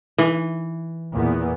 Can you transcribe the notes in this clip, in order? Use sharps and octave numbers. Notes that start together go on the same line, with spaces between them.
E3
E2 A#2 B3